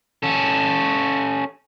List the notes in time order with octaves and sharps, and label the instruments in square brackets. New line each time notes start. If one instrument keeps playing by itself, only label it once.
[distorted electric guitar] C#4 A4